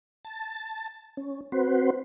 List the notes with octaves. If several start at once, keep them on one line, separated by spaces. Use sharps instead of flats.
A5
C#4
C4 F#4 B4 C5